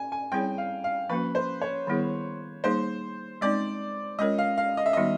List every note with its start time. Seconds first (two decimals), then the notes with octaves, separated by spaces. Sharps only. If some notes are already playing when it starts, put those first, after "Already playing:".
Already playing: G#5
0.12 G#5
0.32 G3 C4 E4 G#4 C#5 G5
0.58 F5
0.84 F5
1.09 F3 A#3 C#4 F#4 B4
1.35 C5
1.61 C#5
1.87 D#3 G3 B3 E4 G#4
2.64 G3 A#3 D#4 G#4 C5
3.41 G#3 C4 D#4 D5
4.19 G#3 C#4 F4 A#4 C#5 D#5
4.38 F5
4.58 F5
4.77 D#5
4.86 E5
4.93 D#3 G3 B3 D#4 F#4 D#5